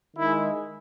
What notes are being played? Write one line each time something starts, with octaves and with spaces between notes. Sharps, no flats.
D#3 G#3 E4